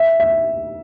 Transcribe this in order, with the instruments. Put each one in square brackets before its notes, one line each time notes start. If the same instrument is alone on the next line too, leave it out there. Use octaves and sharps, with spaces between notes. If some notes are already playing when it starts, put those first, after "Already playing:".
Already playing: [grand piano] E5
E5